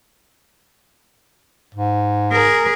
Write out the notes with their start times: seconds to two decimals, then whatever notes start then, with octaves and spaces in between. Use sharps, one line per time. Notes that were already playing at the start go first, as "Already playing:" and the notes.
1.74 G#2
2.33 G#4 A#4